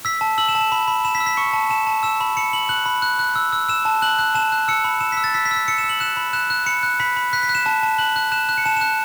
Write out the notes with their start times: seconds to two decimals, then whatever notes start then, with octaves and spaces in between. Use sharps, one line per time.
0.05 E6 B6
0.21 A5
0.38 E6 F#7
0.49 E7
0.55 A5
0.61 E7
0.72 B5
0.88 B5
1.05 B5 E7
1.15 B6
1.20 E6
1.26 B6
1.37 C#6 C#7
1.53 A5
1.70 A5 E7
1.87 A5
2.03 E6 E7
2.21 B5
2.37 B5 C#7
2.53 B5 F#7
2.69 F#6 F#7
2.86 B5
3.02 F#6
3.19 F#6
3.36 E6
3.53 E6
3.68 E6 E7
3.85 A5
4.02 F#6 F#7
4.19 F#6
4.35 A5 E7
4.52 F#6
4.68 E6 C#7
4.84 B5
5.01 E6 E7
5.12 E6 B6
5.24 A6
5.34 E6 B6
5.45 B6
5.51 E6
5.56 B6
5.68 E6 C#7
5.78 E7
5.84 E6
5.89 F#7
6.00 F#6 E7
6.17 B5
6.33 F#6 E7
6.50 F#6
6.66 B5 C#7
6.83 F#6
7.00 B5 B6
7.17 B5
7.33 F#6 B6
7.43 B6
7.49 F#6
7.55 E7
7.66 A5
7.83 A5
7.98 F#6 F#7
8.16 F#6
8.32 F#6 E7
8.49 F#6
8.58 C#7
8.66 A5 E7
8.77 F#6 E7